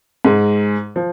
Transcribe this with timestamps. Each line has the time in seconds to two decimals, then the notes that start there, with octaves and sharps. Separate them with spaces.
0.25 G#2 G#3
0.96 F3